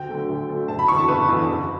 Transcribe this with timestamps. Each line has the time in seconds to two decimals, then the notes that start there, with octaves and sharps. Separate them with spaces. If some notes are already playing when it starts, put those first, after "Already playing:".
Already playing: D2 G5
0.09 D3 F#3 A3
0.29 D2
0.49 D3 F#3 A3
0.68 F#1 A5
0.79 B5
0.88 E2 D3 C#6
0.98 A5
1.08 F#1 B4
1.28 E2 D3
1.48 F#1